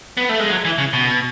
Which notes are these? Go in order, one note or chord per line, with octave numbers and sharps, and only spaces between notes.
B3
A3
G#3
F#3
E3
C#3
B2